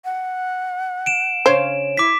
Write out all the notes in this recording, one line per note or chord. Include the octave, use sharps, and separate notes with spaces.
F#5
D7 E7
C#3 C5 C#5 F5
E4 D6 B6